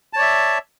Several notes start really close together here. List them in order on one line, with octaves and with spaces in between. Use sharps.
A5 C#5 D5 E5